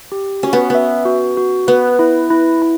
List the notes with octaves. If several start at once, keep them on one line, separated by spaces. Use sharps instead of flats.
G4
C#4 F#4
B3
B3 E5
F#4
F#4
B3 B4
E4
E4
E4